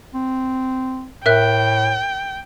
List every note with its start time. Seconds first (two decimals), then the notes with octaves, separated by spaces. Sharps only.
0.14 C4
1.26 A2 A#4 E5 G5 F#6